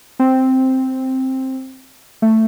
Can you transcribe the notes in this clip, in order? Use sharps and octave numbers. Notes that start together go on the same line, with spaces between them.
C4
A3